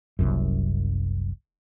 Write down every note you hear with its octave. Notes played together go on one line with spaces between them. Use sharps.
F#1 C2 F#2